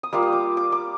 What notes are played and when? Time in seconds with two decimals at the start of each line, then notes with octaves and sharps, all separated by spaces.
0.03 D#6
0.13 G3 A#3 F4 D6
0.22 D#6
0.32 D6
0.57 D6
0.72 D6